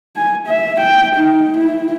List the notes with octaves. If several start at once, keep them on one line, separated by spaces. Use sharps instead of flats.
G#5
E5
G5
D#4
E4